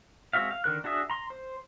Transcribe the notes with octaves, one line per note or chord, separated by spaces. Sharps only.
G#3 C4 F#4 E5 F5
F5
D3 D#3 A#4 F#6
D4 F#4 G#4 E5 D#6
A#5 C6
C5